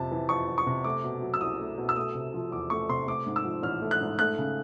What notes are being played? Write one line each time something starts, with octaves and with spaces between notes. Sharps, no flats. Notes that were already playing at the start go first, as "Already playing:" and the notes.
Already playing: F2 C3 A5
E3
F2 C#6
F2
C#6
C3
A3 D6
B2
F#3
E6
C2 D#6
A3
B2
E6
A3 D#6
C3
F3
E2 D6
A3 C#6
C3 C6
A3 D6
G#2
E6
F3
A1 F6
A3
F#6
G#2
A3 F#6
C#3